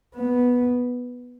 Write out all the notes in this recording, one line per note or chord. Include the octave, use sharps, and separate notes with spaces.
B3